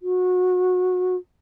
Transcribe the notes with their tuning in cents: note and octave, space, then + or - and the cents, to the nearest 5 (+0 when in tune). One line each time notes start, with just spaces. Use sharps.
F#4 -25